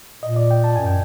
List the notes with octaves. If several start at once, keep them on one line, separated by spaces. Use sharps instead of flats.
A#2 D#5
D5
G5
A5
F#2 G#5
G5